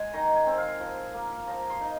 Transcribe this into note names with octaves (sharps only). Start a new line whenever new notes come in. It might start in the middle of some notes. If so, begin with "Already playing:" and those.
Already playing: G#3 G#5 C6
D#3 A#5
G#5
C4
F5
F3
A#3
F3 A#5
C6
D#4